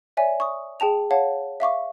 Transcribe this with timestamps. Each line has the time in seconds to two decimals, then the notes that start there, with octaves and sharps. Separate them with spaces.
0.17 C#5 D5 E5 G#5
0.40 C#6 D#6
0.80 G#4 G5 A5 F7
1.11 C#5 F5 F#5 A5
1.60 E5 F5 C#6 D6